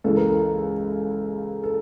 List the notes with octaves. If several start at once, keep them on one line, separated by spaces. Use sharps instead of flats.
C#2 C#3 E3 A4
A#4
A4
A4